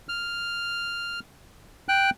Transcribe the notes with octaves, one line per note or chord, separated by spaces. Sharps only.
F6
G5 F#6